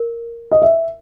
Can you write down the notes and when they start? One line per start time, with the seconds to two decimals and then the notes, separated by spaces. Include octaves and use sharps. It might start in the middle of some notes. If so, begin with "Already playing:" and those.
Already playing: A#4
0.51 D#5
0.62 E5